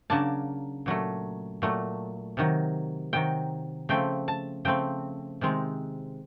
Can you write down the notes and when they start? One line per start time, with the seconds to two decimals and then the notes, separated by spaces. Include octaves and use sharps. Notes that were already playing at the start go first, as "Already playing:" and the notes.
0.10 C#3 F#3 A#3 D4 A5
0.86 A#2 F#3 A3
1.62 A#2 F#3 A3
2.37 C3 D#3 F#3
3.13 C3 D#3 F#3 G5
3.89 C#3 F3 A3 C4 G5
4.28 A5
4.65 C#3 F3 A3 C4 G5
5.41 C3 D#3 G#3 C4